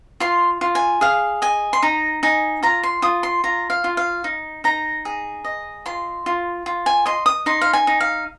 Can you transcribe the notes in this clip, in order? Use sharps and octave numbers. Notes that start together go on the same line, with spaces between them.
F4 C6
F4
G#5
G#4 F5
D#5 G#5
C6
D#4 A#5
D#4 G#5
F4 A#5
C6
F4 D#6
C6
F4 A#5
F5
F4
F5
D#4
D#4 A#5
G#4
D#5
F4 C6
F4
F4
G#5
D#5 C6
D#6
D#4 C6
F5
G#5
D#4
F5